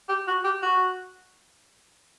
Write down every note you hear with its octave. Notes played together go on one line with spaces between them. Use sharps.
G4
F#4
G4
F#4